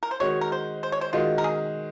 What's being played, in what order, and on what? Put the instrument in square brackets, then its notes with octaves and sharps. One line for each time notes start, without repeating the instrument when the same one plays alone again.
[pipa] A#4
C5
[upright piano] D#3 G#3 D#4 F#4 [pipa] C#5
[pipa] A#4
C5
C5
C#5
C5
[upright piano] D#3 G#3 D#4 F#4 [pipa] F4
[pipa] A#4
G#4